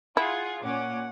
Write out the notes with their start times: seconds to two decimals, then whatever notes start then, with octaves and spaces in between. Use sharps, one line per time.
0.17 E4 F4 G#4 F#5
0.63 A#2 C#4 F#5 D6